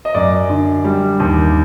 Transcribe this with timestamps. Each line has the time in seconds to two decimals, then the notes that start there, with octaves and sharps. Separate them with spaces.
0.05 D#5
0.15 F#2 D5
0.50 D3
0.84 G3
1.20 D#2